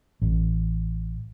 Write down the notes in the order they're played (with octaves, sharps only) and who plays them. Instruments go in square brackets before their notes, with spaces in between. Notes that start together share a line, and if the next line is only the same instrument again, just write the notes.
[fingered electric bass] A1